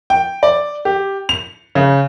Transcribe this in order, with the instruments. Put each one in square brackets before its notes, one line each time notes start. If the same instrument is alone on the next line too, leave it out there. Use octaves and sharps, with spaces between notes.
[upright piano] G5
D5
G4
F7
C#3